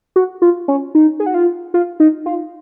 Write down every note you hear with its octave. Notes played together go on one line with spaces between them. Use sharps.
F#4
F4
C#4
D#4
G#4
F#4
F4
F4
D#4
F4